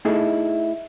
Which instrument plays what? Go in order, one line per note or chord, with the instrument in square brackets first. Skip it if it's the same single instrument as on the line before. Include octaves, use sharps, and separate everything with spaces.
[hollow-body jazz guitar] A3 D#4 E4 G#4 A4 E5